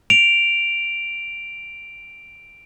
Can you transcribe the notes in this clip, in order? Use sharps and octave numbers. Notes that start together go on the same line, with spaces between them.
D7 F7